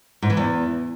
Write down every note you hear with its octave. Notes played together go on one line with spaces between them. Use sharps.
G#2
E3
E2